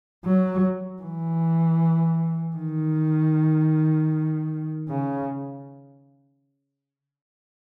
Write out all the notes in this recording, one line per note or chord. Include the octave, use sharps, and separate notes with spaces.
F#3
E3
D#3
C#3